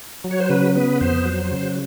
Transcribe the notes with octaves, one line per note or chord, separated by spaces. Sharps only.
F#3
C#5
C5
C#3 B4
B3 B4
F2 C5
F#3
C#3